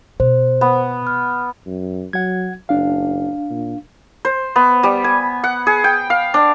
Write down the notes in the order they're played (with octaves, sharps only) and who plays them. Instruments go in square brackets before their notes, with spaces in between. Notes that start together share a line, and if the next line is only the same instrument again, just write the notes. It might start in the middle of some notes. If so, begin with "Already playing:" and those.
[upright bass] B2 [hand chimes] C5
[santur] B3
[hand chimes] F6
[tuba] F#2
[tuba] F#3 [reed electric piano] F#5 G#6
[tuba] F#1 [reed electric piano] D4 F5
[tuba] A#2
[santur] C5
B3
G3
G#5
F#5
G#4
G5
F5
D4